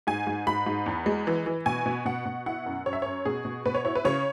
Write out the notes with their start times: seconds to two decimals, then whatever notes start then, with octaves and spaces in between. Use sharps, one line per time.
0.07 G#2 G#5
0.27 G#2
0.47 G#2 B5
0.66 G#2
0.86 E2
1.06 G#3
1.27 E3
1.46 E3
1.66 B2 G#5
1.86 B2
2.05 B2 F#5
2.26 B2
2.46 E4 F#5
2.66 F#2
2.86 F#2 C#5
2.93 E5
3.02 F#2 C#5
3.25 B2 G#4
3.45 B2
3.66 B2 B4
3.75 C#5
3.85 E4 C#5
3.95 B4
4.05 C#3 C#5